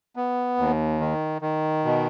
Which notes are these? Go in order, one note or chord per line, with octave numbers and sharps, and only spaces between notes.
B3
D#2
D#3
D#3
B2